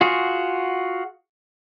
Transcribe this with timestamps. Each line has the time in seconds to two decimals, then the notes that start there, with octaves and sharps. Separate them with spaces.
0.01 F4 F#4 G#4